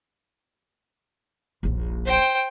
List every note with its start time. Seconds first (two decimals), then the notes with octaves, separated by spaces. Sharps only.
1.63 D#1 A#1
2.05 C5 G5